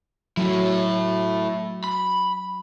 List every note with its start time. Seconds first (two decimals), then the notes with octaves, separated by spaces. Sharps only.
0.37 F#3 A3 E4
1.84 B5